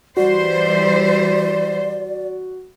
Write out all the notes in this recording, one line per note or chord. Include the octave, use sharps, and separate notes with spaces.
E3 G3 F#4 C5 D5